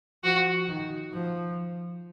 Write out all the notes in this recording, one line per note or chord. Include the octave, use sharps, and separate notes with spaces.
F3 F#4
D#3
F3